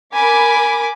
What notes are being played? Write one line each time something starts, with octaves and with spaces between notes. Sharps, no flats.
A#4 G#5 B5 D6